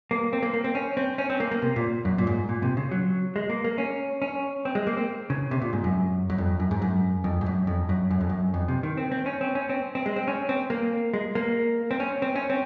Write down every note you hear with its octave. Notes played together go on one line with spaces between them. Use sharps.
A#3
C4
A#3
A#3
C4
C#4
C4
C#4
C4
A#3
A#3
C3
A#2
F#2
A#2
G#2
A#2
C3
C#3
F#3
G#3
A#3
A#3
C#4
C#4
C4
G#3
A#3
C4
C#3
C3
A#2
G#2
F#2
F#2
F2
F#2
G#2
F#2
F2
G#2
F#2
F2
F#2
F#2
F2
F#2
F2
C3
D#3
C4
C4
C#4
C4
C#4
C4
C4
G#3
C4
C#4
C4
A#3
G#3
A#3
C4
C#4
C4
C#4
C4